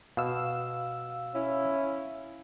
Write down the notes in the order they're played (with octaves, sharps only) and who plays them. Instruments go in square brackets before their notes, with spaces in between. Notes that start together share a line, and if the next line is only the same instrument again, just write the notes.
[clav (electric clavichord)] B2 [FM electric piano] F5 E6
[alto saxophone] C#4 [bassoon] E4